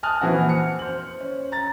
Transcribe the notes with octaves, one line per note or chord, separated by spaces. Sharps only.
G#5 A5 D#6 F6 F#6
A#2 E3 F3 C4 F#4
F6 C#7
C5 F#7
C#4
A#5 A6